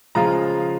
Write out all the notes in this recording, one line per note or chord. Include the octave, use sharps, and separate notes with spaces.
C#3 F3 G#3 F4 A#5